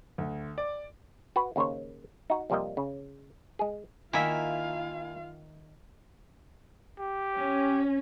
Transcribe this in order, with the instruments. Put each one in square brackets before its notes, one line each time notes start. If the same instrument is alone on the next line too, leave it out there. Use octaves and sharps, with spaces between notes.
[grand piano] D2
D5
[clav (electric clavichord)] F#4 B4
D#2 C#3 A#3 C5 C#5
D#4 F#4
F2 C3 G3 A#3 D#5
C#3
G#3 G#4
[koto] D#3 E5 [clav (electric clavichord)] A#3 E4 [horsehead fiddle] F4 F5 [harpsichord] G#5
[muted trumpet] G4
[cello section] C#4